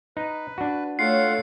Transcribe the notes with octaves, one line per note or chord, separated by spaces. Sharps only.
D#4 B4
D4 F#4
A3 F4 C#5 F#5 C7